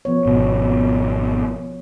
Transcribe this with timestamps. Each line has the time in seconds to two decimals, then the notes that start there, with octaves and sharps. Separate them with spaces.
0.05 F3 B3 C#5
0.26 G#1 B2